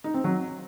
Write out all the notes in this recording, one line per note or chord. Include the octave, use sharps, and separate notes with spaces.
D#4
C4
F#3